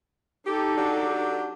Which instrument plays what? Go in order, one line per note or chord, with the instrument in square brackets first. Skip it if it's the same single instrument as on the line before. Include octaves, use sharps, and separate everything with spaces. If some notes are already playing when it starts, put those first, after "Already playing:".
[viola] D#4 A4 [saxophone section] G4
[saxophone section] F#3 D4 G4